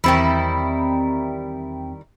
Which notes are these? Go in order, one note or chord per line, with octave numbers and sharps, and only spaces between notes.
E2 D#3 G3 C4 E4 G5